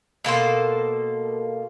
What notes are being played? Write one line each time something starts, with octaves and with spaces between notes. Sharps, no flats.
B2 A#3 A4 C5